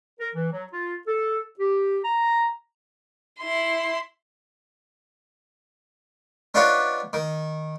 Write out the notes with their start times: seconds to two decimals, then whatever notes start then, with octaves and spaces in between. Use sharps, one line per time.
0.19 A#4
0.34 E3
0.52 F#3
0.72 F4
1.07 A4
1.60 G4
2.04 A#5
3.40 E4 C6
6.54 B3 D4 D#4 F4 B4 C#5
7.13 D#3